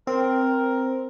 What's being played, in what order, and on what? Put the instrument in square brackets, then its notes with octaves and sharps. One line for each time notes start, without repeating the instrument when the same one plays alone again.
[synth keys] C4 [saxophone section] A#4 [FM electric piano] C5